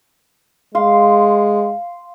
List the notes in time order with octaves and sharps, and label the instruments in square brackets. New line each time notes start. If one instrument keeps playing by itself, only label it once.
[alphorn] G#3 [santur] F5 C6